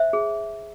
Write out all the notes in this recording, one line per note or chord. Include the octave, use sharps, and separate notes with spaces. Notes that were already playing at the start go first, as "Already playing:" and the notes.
Already playing: C5 E5
G#4